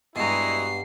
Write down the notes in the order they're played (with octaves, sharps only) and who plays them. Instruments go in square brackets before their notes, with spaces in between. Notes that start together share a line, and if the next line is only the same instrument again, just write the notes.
[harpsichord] G2 B2 [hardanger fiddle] G#3 A#5 [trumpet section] E4 F#4 D#5 [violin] C7